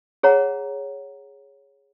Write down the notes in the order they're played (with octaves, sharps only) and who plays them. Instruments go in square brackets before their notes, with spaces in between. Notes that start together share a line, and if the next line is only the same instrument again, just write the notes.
[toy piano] G#4 C#5 F#5 A#5